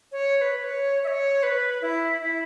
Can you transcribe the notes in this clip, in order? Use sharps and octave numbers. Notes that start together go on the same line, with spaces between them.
C#5
C#5
B4
C#5
E5
C#5
B4
E4
E4